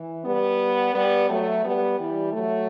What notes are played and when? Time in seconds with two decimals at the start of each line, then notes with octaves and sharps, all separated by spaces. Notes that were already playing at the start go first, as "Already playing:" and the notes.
Already playing: E3
0.23 G3 B3
0.93 G3 B3
1.28 F#3 A3
1.63 G3 B3
1.98 E3 G3
2.32 F#3 A3